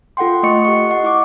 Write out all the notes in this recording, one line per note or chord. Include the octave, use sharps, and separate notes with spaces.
F4 A4 F#5 G5 C6
A3 D#5 C#6 C#7
G4 F#5 C#6
D#5 F#5
E4 C#6 D6